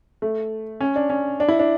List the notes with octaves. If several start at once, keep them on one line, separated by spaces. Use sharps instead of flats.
A3
C#4
D4
C#4
D4
E4
D4